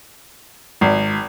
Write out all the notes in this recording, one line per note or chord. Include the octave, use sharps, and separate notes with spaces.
G#1